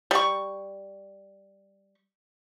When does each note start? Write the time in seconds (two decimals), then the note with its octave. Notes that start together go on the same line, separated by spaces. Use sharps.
0.11 G3 C#6